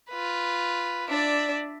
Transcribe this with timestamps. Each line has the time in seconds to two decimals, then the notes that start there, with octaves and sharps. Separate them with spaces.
0.10 F4 B4
1.09 D4 D5 E5